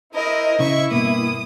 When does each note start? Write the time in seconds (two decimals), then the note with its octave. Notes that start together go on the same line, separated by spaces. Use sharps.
0.15 E4 A#4 C5 D#5
0.60 C#3 E4 E5 C#6
0.91 G2 B2 A#3 D#6